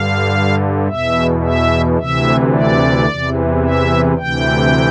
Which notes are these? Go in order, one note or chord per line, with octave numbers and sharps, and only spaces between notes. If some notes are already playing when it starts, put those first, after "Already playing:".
Already playing: G2 D3 F5
E2 B2 E5
E5
D2 C3 E3 E5
D5
E2 C3 E3
E5
D2 C3 E3 G5